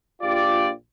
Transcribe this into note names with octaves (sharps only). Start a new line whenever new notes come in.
A#1 F4 G4 D5